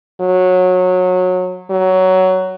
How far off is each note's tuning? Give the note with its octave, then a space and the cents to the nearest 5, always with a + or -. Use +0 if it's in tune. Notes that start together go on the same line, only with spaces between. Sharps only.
F#3 -20
F#3 +10